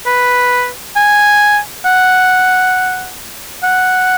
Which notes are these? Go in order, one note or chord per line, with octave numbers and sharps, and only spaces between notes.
B4
G#5
F#5
F#5